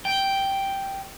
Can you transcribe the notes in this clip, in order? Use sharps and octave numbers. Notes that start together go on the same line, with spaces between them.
G5